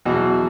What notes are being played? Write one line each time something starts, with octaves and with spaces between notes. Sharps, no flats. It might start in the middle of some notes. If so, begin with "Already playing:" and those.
E2 B2 F#3 F#4